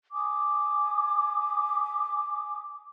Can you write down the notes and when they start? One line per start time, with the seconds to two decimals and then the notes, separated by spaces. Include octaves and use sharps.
0.13 G#5 D6 D#6